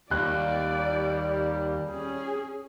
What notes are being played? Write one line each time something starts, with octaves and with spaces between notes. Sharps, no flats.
D#2 G3 D5 F#6
C#4 G#4